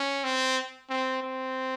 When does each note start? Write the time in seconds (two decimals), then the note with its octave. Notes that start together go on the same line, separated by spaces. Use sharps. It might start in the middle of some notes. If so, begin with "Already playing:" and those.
Already playing: C#4
0.24 C4
0.90 C4
1.23 C4